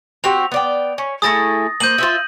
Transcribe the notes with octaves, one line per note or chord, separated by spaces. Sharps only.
C4 F#4 G4 F7
B3 D5 G5
C#4
A3 E4 G#4 D#6 A6 A#6
A#3 C5 G6 D#7 F#7
F4 C5 E5